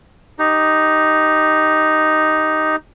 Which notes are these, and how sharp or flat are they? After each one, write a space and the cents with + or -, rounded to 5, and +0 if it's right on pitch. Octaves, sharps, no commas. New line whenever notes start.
D#4 +0 G4 +0